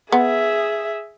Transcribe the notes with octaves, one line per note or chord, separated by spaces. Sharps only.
B3 G#4 E5